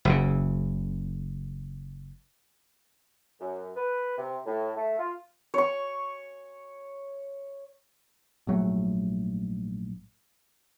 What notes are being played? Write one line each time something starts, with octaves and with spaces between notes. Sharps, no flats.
F#1 C#3
F#2
B4
C3
A2
A3
F4
C#5 C#6
A#1 G#2 F#3 A3